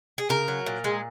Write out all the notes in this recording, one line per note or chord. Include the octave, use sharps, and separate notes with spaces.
G#4
C#3 A#4
F#3
A#2
G#3